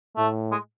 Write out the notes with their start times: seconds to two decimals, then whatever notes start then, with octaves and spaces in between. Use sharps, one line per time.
0.17 A2 A3
0.52 G#3